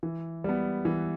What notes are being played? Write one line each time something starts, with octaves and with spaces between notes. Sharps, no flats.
E3
G3 B3
E3